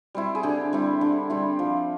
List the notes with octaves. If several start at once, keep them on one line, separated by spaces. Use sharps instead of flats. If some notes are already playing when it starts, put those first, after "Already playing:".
G3 C4 E4
G#4
D3 G4
G3 C4 E4
D3
G3 C4 E4
F3